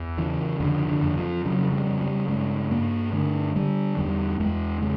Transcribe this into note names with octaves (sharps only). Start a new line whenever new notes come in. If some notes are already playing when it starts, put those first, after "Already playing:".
Already playing: E2
C#3 E3
F2 D3
D3
F2
F3
C#3 F#3
G3
C#3
G3
G2 G#3
G2 A#3
D3 A3
D3 G3
E2 G3
E2 G#3
C#3 G#3